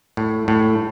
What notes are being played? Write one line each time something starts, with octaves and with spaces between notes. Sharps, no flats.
A2
A2